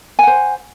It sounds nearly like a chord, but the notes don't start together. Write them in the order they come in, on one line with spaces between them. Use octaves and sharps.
G#5 F#5 C5